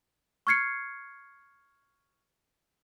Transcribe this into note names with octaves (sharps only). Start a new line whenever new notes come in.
C#6 F6 G#6 C7 C#7